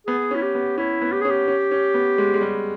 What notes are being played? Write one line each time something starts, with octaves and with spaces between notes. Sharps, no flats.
B3 G#4
C#4
E4
G4
B3
C#4 E4
B3
G4
G#4
C#4
G4
C#4
C#4
B3
G#3
G#3
G3